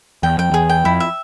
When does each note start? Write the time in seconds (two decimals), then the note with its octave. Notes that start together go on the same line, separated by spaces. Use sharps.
0.23 E2 G5
0.38 F2 G5
0.51 E2 G#4
0.69 G5
0.85 F2 E4
1.00 E5